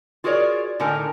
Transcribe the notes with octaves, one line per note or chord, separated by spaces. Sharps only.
F4 F#4 G#4 A#4 C#5 D5
A2 D3 D#4 A#4 G#5 A#5